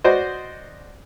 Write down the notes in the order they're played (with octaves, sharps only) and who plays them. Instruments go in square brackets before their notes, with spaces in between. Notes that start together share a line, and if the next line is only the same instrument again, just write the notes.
[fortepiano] F#4 C5 D5 D#5